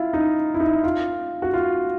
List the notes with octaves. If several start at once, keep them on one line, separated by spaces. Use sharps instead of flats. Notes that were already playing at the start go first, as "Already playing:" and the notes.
Already playing: E4 F4
D#4
E4
D#4
F4
F#4
F4